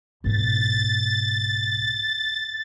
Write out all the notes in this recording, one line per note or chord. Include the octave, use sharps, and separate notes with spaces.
B1 G#2 A6